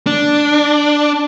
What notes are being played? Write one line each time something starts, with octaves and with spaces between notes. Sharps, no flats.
D4